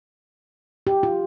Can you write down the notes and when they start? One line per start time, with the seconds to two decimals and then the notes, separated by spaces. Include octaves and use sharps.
0.87 G4
1.03 F4